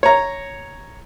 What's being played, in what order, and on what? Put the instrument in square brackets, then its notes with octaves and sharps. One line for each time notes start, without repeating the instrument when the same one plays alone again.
[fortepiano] C#5 A#5